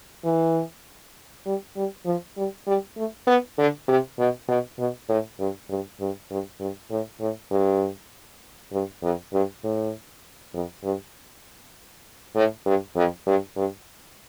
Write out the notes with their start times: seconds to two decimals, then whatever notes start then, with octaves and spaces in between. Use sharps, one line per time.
0.25 E3
1.46 G3
1.77 G3
2.06 F3
2.37 G3
2.67 G3
2.97 A3
3.27 B3
3.58 D3
3.88 C3
4.19 B2
4.48 B2
4.79 B2
5.09 A2
5.39 G2
5.70 G2
6.00 G2
6.31 G2
6.60 G2
6.91 A2
7.20 A2
7.51 G2
8.72 G2
9.03 F2
9.33 G2
9.64 A2
10.54 F2
10.84 G2
12.35 A2
12.66 G2
12.96 F2
13.27 G2
13.57 G2